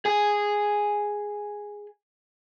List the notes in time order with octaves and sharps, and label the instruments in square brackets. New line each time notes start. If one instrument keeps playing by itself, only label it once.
[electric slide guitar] G#4 G#5